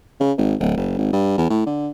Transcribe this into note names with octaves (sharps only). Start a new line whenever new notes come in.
C#3
G#1
D1
F#1
G#1
G2
E2
A2
D3